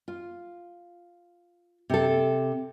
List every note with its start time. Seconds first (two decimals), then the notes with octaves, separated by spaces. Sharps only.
0.08 F4
1.90 C3 A4